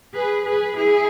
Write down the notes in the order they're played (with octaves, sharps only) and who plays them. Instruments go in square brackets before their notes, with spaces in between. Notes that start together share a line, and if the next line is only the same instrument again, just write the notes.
[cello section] G#4 B4
G#4 B4
E4 G#4